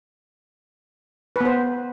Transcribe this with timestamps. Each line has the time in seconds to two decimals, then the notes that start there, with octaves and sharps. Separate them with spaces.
1.36 B4
1.41 B3
1.45 C5